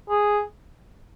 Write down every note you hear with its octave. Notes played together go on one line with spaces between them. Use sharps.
G#4